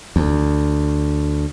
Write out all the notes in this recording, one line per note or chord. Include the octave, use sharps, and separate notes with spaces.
D2